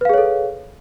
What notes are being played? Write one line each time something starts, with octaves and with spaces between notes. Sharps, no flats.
G#4 A4 B4 C#5 F5